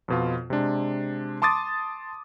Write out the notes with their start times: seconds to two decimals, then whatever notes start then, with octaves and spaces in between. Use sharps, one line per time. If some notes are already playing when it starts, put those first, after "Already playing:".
0.08 F2 B2 F4
0.50 C3 G#3 D4
1.42 A5 C6 D6 D#6 A6